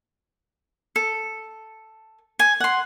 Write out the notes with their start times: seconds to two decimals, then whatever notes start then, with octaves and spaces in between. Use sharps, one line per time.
0.96 A4
2.39 G#5
2.60 F#5 C6